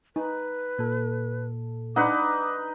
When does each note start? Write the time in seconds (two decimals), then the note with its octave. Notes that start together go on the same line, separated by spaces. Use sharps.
0.16 D#4 B4
0.79 A#2 A4
1.96 D4 D#4 B4 F#5 D6